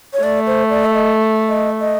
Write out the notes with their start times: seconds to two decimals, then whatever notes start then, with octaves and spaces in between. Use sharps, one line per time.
0.14 C#5
0.23 A3 D5
0.47 C5
0.70 D5
0.85 E5
0.94 D#5
1.49 D#5
1.80 D#5